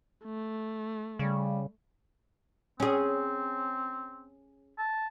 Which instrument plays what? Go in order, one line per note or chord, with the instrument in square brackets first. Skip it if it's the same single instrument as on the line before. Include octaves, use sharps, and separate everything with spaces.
[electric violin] A3
[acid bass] C#3 [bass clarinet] G3
[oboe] C4 [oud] C#4 G#4
[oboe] A5